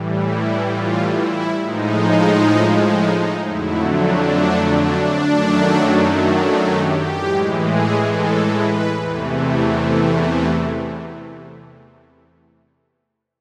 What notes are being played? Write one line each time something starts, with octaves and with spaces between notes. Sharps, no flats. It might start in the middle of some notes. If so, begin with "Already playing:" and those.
Already playing: A2 E3 G3
E4
F4
E4
A2 F3 G#3 D#4
D#4
F2 D3 F#3 A3 E4
D4
D4
F#2 D#3 F#3 A3
D4
G4
A2 E3 G#3
G#4
A4
B4
E2 C3 E3 A3